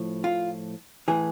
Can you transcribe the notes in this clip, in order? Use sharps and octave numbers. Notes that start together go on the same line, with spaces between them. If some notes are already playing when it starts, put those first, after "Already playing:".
Already playing: A2 F3
F4
A2 E3 G#4